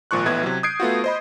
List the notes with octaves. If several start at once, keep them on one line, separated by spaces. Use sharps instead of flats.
G#1 A#2 F3 C#6 F#6
A1 A2 B3 E4 G#6
C3 F#3
D#6 G6 G#6 C7 D7
A3 B3 F4 F#4
C5 D#5 B5